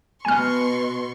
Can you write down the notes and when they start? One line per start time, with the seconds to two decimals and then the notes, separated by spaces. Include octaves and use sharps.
0.25 B2 G#5 C6 C#6 F6